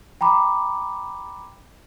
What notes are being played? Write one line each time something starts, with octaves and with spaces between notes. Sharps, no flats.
G5 A#5 B5 D6